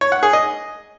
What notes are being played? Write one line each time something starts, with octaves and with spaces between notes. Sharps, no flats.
C#5
F#5
G#4
D#5